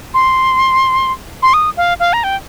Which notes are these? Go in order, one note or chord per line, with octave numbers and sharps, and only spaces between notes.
C6
C6
D#6
F5
F5
A#5
G5